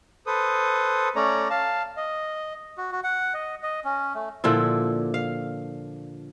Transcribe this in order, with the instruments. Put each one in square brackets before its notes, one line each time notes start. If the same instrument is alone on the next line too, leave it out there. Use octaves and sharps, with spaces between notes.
[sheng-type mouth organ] A4 B4 C5 D#6
A3 C#4 C#5 D5 A#5
F5 A5
D#5
[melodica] F#4
F#4
F#5
D#5
D#5
C#4
A3
[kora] A#2 D3 F3 E4
F5